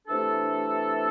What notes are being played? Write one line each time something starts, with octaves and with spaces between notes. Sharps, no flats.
C3 E3 A3 D4 A4